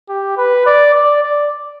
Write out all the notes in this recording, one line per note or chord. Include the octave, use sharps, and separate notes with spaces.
G4
B4
D5
D5
D5